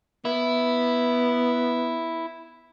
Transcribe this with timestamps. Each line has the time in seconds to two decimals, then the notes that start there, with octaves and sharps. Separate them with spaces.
0.25 B3 E4